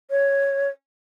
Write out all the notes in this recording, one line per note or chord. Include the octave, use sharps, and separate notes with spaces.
C#5